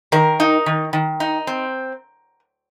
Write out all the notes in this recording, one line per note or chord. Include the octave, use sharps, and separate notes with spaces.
D#3 A#4
D#4
D#3
D#3
D#4
C4